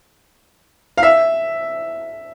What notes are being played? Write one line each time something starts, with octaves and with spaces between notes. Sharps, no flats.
F5
E5